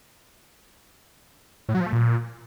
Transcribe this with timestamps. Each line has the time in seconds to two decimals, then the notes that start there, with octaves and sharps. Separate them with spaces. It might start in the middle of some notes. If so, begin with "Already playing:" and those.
1.69 A2
1.75 F#3
1.81 F3
1.86 A3
1.92 A#2